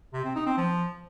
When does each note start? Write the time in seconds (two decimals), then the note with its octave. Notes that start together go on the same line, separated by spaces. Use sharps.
0.14 C3
0.25 C4
0.36 D#4
0.47 C4
0.58 F3